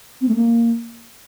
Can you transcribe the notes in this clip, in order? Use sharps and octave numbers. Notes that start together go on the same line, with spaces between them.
C4
A3
A#3